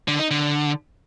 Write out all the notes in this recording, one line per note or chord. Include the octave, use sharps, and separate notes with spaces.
D3
D#4
D3